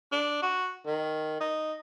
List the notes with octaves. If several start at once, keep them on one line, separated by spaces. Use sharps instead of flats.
D4
F#4
D#3
D#4